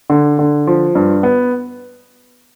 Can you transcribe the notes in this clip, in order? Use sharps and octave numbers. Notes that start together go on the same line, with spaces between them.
D3
D3
F3
G2
B3